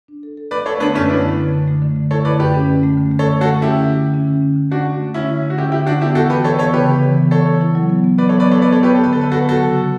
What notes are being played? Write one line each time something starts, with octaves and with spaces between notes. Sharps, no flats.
D4
A4
A4
A3 B4 D5
A3 A4 C#5
D3 B3 D4
F#2 A3 C#4
B3 D4 E4
D3
D3
D3
A3
D3
A3
E4 A4 C#5
D3 B4 D5
F#2 G4 B4
C#4
D3
A3
D3
A3
A4 C#5
D3
A3 F#4 A4
C#4
E4 G4
D3
D3
D3
C#4
D3
C#4
D3
A3 D4 F#4
A3
D3
D3 C#4 E4
D3
C#4
F#4
D3 E4 G4
D3 E4 G4
D3 D4 F#4
B3 E4 G4
E3 F#4 A4
E3 G4 B4
E3 A4 C#5
B3 A4 C#5
C#3 G4 B4
E3
E3
B3
E3 A4 C#5
E3
E4
F#3
B3
B3
F#3 B4 D5
A4 C#5
B3
B4 D5
B3 A4 C#5
B3 B4 D5
A4 C#5
B3
G4 B4
B3 A4
D3 B4
A4
D3 B4
F#4 A4
B3
F#3 F#4 A4
C#3
C#3